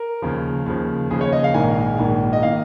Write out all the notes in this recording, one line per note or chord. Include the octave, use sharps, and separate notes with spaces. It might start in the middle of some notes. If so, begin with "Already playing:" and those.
Already playing: A#4
D#2 C#3 F3
D#2 C#3 F3
D#2 C#3 F3 G#4
C#5
D#5
F5
A#1 G#2 D#3 A#3 G#5
A#1 G#2 D#3 A#3
D#5
D#3 A#3 F5